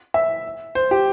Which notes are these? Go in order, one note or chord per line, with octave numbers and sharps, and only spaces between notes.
E5
C5
G4